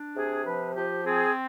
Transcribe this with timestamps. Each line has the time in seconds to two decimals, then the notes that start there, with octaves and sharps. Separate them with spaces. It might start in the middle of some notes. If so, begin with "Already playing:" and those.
Already playing: D4
0.16 C3 G#4
0.45 F3 B4
0.75 F3 G4
1.04 C4 G#4